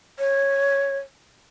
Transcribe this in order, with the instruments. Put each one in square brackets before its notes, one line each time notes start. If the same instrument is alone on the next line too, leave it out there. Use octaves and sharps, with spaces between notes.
[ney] C#5